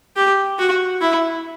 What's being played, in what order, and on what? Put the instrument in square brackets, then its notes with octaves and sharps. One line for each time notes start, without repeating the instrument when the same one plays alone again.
[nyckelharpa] G4
F#4
E4